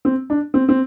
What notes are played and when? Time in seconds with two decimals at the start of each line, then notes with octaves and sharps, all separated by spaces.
0.05 C4
0.30 D4
0.54 C4
0.69 C4